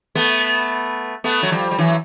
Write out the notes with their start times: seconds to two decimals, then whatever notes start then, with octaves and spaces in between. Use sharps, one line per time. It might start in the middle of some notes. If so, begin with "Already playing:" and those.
0.15 A3 B3
1.24 A3 B3
1.43 F#3
1.52 F3 G3
1.71 G3
1.79 E3 F#3